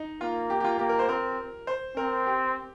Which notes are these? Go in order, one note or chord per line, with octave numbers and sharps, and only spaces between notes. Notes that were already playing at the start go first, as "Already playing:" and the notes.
Already playing: D#4
A#3 F4
G4
G4
F4
A#3 G4
A#4
C5
C4 A#4
C5
C4 A#4
G4